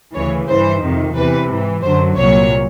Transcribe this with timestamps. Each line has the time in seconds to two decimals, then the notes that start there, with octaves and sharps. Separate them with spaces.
0.14 D2 C#3 E3 C#5
0.48 G2 E3 C5
0.82 F2 C3 D#3
1.16 E2 C3 E3 B4
1.50 G#2 E3
1.83 F#2 D3 F#3 C5
2.17 C2 A#2 F#3 C#5